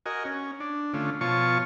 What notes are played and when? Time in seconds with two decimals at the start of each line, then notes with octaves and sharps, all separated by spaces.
0.06 F#4 A#4 D#5 G#5
0.25 C#4
0.60 D4
0.94 D3 A3 C#4 F4
1.21 B2 F3 F4 C#5 A5 C#6